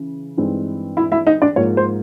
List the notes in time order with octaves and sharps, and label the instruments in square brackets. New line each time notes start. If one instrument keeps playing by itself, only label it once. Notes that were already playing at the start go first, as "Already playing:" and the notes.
Already playing: [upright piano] C#3 E3
G2 E3 G#3 C4 D#4
E4 E5
E4 E5
D#4 D#5
D4 D5
G#2 F3 A#3 C#5
C5